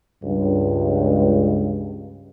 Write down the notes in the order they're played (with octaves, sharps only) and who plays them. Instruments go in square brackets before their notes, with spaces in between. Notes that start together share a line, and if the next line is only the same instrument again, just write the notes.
[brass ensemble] C#2 G2